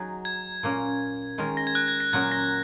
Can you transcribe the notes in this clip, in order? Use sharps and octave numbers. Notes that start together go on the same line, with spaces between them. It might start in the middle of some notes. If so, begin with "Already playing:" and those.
Already playing: F#3 D#4 G#4
G#6
A#2 A#3 C#4 A#4
D#3 G#3 C#4 A#4
A#6
G#6
F#6
G#6
A#6
A#2 F#3 C#4 A#4 G#6
A#6